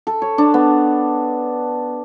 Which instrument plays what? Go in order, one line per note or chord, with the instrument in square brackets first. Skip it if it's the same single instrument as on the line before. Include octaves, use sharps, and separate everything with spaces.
[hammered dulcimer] A4
C#5
D4
B3